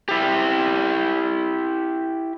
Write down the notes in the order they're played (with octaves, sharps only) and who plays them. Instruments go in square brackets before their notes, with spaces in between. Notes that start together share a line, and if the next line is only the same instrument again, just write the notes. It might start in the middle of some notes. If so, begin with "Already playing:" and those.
[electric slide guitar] E4 G4